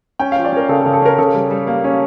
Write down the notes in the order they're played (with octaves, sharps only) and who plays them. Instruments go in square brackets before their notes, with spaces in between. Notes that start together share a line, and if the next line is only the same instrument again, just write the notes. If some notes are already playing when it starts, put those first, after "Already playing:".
[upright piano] C#4 G5
F5
F3
D5
C#4 A#4
C#3 A4
A4
C#3
A4
C#4 A#4
C#3 A4
G3
G3
A#3
C#4